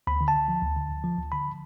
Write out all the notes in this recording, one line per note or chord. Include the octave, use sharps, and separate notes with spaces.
D2 B5
D3
A5
D2
F3
D2
D3
D2
F3
D2
D3 B5